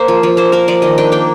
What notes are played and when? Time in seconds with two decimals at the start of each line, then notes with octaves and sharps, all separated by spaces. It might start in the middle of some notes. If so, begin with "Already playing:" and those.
Already playing: A#3 C5
0.08 F3
0.23 F3
0.37 A#3 C5
0.52 A#3 A#4
0.68 F3 D5
0.82 D#3 D#5
0.98 D4 G5
1.12 A#3 G5